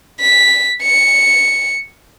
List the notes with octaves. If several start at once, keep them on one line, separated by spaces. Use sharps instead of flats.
B6
C#7